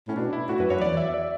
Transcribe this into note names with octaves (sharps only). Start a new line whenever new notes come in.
A2 C#4
B2 D4
E4
A2 F#4
F#2 B4
F#2 C#5
E2 D5
E5
E5
D5